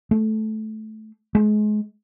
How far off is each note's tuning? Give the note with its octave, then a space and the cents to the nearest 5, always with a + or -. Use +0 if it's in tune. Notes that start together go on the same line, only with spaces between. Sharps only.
A3 -15
G#3 +30